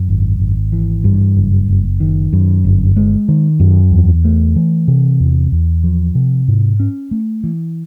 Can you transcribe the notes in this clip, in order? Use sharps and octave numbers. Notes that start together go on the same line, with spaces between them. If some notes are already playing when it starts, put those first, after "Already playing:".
Already playing: F#2
G#1
G#1
E3
G2
F#1
F#1
D#3
F#2
G1
G#3
D#3
F#2
E2
A3
E3
C3
E2
E2
F3
C3
G#2
C#4
A3
E3